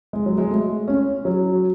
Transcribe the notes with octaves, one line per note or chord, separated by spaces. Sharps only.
G#3
F#3
G#3
A3
C#4
F#3